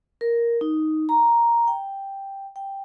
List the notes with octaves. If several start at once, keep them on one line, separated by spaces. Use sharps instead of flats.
A#4
D#4
A#5
G5
G5